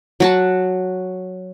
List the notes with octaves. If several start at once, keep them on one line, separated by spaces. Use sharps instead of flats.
F#3 F#4 A5